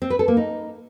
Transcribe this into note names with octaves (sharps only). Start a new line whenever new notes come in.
C4
B4
A4
A#3
D#4